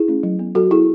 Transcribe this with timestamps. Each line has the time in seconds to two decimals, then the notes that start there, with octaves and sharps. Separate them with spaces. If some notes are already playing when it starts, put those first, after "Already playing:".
Already playing: E4 G#4
0.08 A3 C#4
0.23 F#3
0.39 B3
0.55 F#3 F#4 A4
0.71 B3 E4 G#4